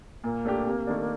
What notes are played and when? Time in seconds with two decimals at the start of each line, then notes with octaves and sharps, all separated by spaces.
0.24 A#2 A#3
0.45 A3 D4 G4
0.66 C3
0.87 D#3 A3 D4